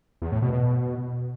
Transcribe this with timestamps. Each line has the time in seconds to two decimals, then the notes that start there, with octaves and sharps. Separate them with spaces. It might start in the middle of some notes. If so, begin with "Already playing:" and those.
0.22 E2
0.32 A2
0.42 B2
0.52 B2